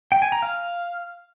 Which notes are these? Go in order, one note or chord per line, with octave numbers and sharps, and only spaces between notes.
G5
G#5
A#5
F5